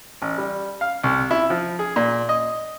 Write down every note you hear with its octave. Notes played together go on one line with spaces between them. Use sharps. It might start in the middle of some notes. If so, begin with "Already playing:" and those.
A1
G3
F5
C2
E4
F3
G#4
A#2
D#5